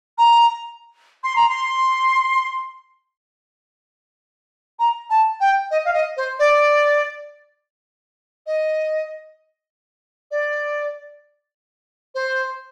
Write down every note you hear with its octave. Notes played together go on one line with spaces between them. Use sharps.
A#5
C6
A#5
C6
A#5
A5
G5
D#5
F5
D#5
C5
D5
D#5
D5
C5